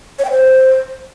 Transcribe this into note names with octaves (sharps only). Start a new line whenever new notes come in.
C#5
G5
C5